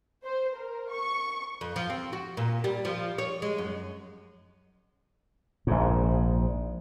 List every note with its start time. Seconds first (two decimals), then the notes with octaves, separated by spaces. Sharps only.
0.24 C5
0.55 A#4
0.90 C#6
1.61 F2
1.76 F3
1.90 C4
2.13 F#4
2.37 A#2
2.64 G3
2.85 F3
3.18 C#5
3.42 G#3
3.58 F#2
5.67 A#1 G#2